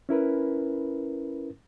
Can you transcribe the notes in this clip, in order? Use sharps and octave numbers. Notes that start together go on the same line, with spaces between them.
C#4 E4 A#4 B4